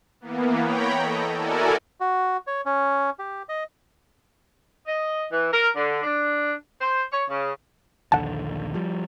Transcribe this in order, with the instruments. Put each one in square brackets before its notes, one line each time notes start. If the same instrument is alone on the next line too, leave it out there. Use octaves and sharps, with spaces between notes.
[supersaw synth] E3 A#3 B3
C#5 G5 A#5 B5
A4 D#5
E4 F#4 A4 A#4 D5 G#5
[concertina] F#4
C#5
C#4
G4
D#5
[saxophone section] D#5
E3
A#4
D3
D4
C5
C#5
C#3
[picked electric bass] A#1 D#2 D3 [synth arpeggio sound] F#5 A5
[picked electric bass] F3 G3